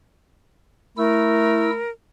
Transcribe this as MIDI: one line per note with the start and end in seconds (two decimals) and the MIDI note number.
0.98 1.81 57
0.98 1.70 64
0.98 1.90 70
0.98 1.70 88